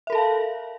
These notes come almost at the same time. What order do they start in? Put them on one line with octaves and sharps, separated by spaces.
E5 A#4 A4 A5 F5